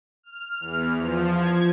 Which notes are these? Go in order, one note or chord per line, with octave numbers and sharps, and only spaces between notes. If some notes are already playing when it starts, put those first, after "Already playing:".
F6
E2
F3
G#6